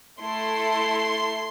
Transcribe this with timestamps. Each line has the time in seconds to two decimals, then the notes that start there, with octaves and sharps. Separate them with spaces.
0.21 A3 E4 A4 C6